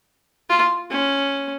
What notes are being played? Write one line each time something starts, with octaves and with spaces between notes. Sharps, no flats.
F4
C#4